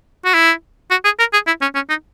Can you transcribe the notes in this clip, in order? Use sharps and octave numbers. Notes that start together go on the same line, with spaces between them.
F#4
E4
F#4
G#4
A#4
G#4
E4
C#4
C#4
D#4